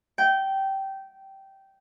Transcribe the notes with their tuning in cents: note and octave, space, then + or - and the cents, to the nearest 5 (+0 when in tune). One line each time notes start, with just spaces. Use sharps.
G5 -15